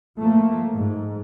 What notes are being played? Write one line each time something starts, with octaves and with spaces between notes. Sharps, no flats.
F3 A3 A#3
G#2